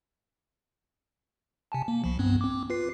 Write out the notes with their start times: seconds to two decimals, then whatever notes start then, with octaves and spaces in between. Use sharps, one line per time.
1.72 C3 G#5 A5
1.88 A#3
2.04 C2 F3
2.19 G2 B3 C4
2.41 C4 D6
2.70 F4 B4 C7